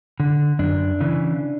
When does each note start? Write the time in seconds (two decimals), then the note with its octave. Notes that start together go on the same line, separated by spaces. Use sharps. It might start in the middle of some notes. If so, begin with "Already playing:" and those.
0.20 D3
0.59 F#2 D4
1.00 C#3 E3